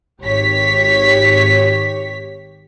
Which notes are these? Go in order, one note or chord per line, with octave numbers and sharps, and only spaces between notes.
G#1 G4 C#5 B6